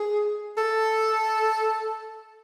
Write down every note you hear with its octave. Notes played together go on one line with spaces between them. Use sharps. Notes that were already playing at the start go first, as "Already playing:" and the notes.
Already playing: G#4
A4